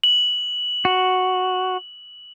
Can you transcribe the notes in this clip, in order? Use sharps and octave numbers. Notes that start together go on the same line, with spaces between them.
F#7
F#4